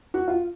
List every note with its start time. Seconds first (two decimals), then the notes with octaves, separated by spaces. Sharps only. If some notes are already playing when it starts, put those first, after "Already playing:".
0.14 F#4
0.28 F4